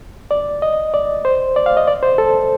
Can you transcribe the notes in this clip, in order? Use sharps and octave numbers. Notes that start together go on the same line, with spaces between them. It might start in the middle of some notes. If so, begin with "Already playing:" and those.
D5
D#5
D5
C5
D5
F5
D#5
D5
C5
A4